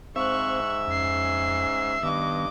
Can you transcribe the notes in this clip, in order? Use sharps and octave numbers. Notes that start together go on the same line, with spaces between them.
G#2 C4 C5 E5 F5 C#6 F#6
F2 C#4 C7
G2 D#3 B3 D#5 D6